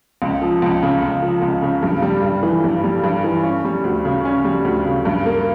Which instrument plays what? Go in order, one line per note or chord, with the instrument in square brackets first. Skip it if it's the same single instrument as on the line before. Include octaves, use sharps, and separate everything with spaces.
[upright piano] C#2
F3
C#2
C#3
C#2
F3
C#2
C#3
G2
G3
G2
E3
G2
G3
G2
E3
C#4
G3
D2
C#3
C#4
G3
D2
C#3
G2
A#3